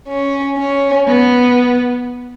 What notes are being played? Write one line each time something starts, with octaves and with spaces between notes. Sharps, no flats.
C#4
C#4
B3